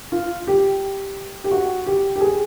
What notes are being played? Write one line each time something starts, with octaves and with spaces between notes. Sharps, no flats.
F4
G4
G4
F#4
G4
G4
G#4